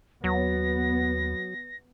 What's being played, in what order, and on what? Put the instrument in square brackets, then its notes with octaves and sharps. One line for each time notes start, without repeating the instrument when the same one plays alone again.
[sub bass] D#2 [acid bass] F#3 [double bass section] B3 [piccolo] A#6